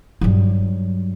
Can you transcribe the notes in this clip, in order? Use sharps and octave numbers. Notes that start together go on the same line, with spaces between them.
G2 F#3